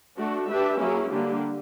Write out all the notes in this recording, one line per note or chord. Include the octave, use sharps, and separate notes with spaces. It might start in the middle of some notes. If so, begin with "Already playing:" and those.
A3 D4 F#4
D4 G4 B4 E5
F#3 A#3 C#4 E4 G#4
D3 G3 A#3 D4 G4